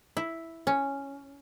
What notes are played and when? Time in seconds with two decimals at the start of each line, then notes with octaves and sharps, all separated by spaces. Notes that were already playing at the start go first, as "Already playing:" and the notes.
0.17 E4
0.67 C#4